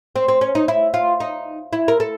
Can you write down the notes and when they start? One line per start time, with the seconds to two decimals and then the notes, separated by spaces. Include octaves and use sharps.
0.16 C4
0.28 C4
0.41 C#4
0.55 D#4
0.68 E4
0.94 F4
1.20 D#4
1.73 E4
1.88 A#4
2.00 A4